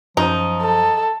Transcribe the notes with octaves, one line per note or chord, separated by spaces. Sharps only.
F#2 F3 D#4
A4